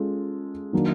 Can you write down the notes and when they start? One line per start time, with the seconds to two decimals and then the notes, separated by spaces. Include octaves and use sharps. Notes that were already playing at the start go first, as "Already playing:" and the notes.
Already playing: G#3 C#4 F4 A4
0.73 D#3 F#3 A#3 D4